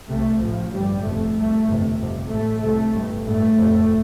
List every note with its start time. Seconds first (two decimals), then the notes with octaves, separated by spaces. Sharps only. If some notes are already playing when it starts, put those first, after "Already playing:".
0.09 C2 C3 A3
0.40 A1 A2 F3
0.72 G1 G2 G3
1.03 F1 F2 C3 A3
1.35 C2 C3 A3
1.67 G1 F2 C3
1.99 G1 F2 C3
2.30 A1 A2 A3
2.62 C2 C3 A3
2.93 G1 G2
3.25 A1 G2 A3
3.57 F1 F2 C3